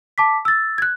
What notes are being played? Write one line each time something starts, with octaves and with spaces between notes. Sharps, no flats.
A5 D6 B6
E6 A6
F#6 G#6